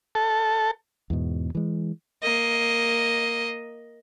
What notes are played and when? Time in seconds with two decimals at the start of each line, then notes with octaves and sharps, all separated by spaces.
0.15 A4
1.10 E2 G#2 B2
1.55 E3 G#3
2.23 A#3 D#5